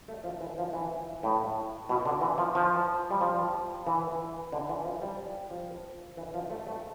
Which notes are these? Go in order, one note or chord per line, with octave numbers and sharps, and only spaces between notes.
A3
F3
E3
F3
E3
A2
B2
D3
E3
F3
F3
G3
F3
E3
D3
E3
F3
G3
F3
E3
F3
A3
A3